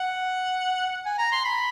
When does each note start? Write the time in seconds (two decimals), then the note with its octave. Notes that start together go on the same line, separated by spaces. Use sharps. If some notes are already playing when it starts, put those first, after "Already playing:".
Already playing: F#5
1.06 G#5
1.18 A#5
1.32 C6
1.45 B5